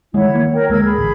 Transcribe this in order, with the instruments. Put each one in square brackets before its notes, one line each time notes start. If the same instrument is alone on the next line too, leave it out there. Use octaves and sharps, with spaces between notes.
[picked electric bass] D#3 G3 G#3 [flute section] E4 C#5 F#5
[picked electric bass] D#3 A#3
[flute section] A#4 C#5 G5
[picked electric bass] D2 G#3 A#3 [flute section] A#4 E6 G#6
[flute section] G#4 B5
[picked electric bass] A1